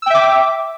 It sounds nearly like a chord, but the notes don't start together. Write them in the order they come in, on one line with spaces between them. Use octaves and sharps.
E6 G5 E5 D6